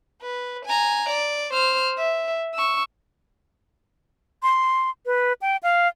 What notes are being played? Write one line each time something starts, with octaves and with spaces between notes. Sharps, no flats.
B4
G#5 A#5
D5
C5 F6
E5
C#6 E6
C6
B4
G5
F5